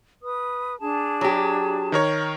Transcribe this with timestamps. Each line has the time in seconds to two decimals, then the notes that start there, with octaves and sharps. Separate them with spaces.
0.22 B4 D#6
0.79 D4 G#4 A5
1.21 F#3 G4
1.92 D#3 A#4 C#5